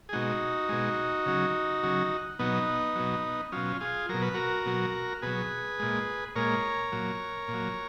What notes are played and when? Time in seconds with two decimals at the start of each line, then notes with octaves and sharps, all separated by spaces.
0.09 G#4
0.13 B2 G#3 D#4 F#4
0.69 B2 G#3
1.26 C#3 F#3
1.83 C#3 F#3
2.39 B2 F#3 B3 D#4
2.95 B2 F#3
3.52 B2 F#3 C#4 F4
3.81 F4 G#4
4.09 B2 F#3 A#4
4.22 B4
4.34 F#4 A#4
4.66 B2 F#3
5.22 B2 F#3 G#4 B4
5.79 A#2 G#3
6.35 A#2 G#3 A#4 C#5
6.92 A#2 F#3
7.48 A#2
7.53 F#3